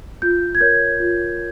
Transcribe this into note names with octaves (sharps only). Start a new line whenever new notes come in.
F4 G6
G#6
A#4 C#5 G6
F4